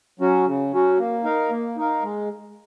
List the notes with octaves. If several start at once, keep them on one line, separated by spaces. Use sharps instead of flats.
F#3 C#4 F#4
C#3
F#3 C#4 F#4
A#3
D#4 A#4 F5
A#3
D#4 A#4 F5
G#3